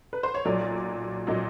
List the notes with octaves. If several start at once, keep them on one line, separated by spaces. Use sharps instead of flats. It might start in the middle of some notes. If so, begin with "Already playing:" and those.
B4
C5
C#5
B1 A#2 F#3 D5
A#2 F#3 D#5